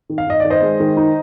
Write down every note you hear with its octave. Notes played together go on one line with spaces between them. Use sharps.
D#3
F5
D#3 D#5
D#3 D5
C5 D#5
G#3
D#3
D#4